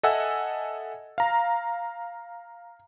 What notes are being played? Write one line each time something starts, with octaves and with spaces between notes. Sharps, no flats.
A4 D#5 E5 F#5 G#5 E6
F5 A#5